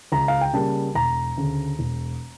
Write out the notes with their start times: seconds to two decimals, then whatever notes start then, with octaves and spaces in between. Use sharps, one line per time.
0.12 C#2 A#5
0.28 F5
0.41 G5
0.53 C#3 G3 A#3 A5
0.95 E1 A#5
1.37 D2 C#3
1.79 E1